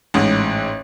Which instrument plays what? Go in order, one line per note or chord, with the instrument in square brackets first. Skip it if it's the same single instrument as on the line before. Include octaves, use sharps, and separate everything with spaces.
[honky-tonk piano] A1 G#2